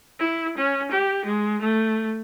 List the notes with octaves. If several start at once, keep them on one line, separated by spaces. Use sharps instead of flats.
E4
C#4
G4
G#3
A3